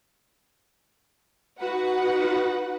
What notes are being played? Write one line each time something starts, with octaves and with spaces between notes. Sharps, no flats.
D#4 F#4 B4 F#5